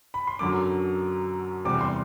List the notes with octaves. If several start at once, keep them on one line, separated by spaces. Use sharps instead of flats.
B5
C6
F#2 D3 F#3 D6
E2 C3 G3 D6
C6